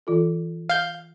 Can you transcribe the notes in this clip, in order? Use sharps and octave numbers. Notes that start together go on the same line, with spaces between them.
E3 F4 A4
F5 G6